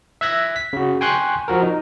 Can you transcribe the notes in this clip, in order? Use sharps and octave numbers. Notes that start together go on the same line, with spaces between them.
E5 E6 F#6 G#6 A#6 B6
B6
C#3 F#4
G5 G#5 C6 C#6 F#6 G6
F3 F#4 A#4
D#4